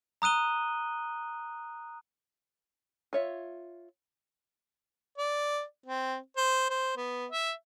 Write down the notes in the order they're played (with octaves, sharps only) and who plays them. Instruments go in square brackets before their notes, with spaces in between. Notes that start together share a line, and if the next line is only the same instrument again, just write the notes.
[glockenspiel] A#5 D#6 F#6 D#7 G7
[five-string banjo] F4 C#5 E5
[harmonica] D5
C4
C5
C5
B3
E5